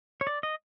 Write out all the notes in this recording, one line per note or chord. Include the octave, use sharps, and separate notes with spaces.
C#5
D5
D#5